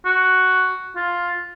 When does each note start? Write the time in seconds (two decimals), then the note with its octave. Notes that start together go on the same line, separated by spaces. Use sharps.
0.06 F#4
0.96 F4